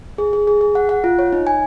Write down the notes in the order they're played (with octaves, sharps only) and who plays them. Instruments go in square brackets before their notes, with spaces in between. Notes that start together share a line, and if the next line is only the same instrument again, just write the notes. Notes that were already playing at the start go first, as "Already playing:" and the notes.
[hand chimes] G#4
G#4
G#4
G#4
F#5
F#5
F4
C#5
D#4
G#5